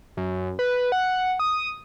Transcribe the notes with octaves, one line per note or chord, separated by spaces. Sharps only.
F#2
B4
F#5
D#6